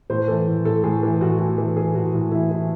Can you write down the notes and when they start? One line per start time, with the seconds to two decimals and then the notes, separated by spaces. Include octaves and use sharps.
0.10 A2 C5
0.28 E3 A4
0.47 A2
0.65 A2 A4
0.84 A2 G#4
1.03 E3
1.21 A2 F#4
1.39 A2 F#4
1.58 E3
1.77 E3 G#4
1.95 A2 F#4
2.13 A2 F#4
2.32 E3 E4
2.51 E3 E4